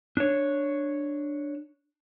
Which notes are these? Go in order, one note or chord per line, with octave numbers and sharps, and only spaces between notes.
D4 C#5